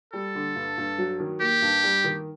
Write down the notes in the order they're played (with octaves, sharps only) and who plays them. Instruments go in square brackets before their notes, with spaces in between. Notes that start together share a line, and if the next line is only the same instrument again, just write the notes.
[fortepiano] G3 [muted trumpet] A4
[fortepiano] D3
G2
G2
F#3
D#3
[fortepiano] A#3 [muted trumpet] G4
[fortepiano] G2
G3
D#3